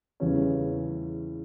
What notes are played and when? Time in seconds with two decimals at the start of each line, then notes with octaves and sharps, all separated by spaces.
0.20 E2 C#3 E3 G3 C#4